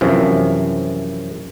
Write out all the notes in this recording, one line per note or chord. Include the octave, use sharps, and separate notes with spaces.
F#2 C3 E3 F3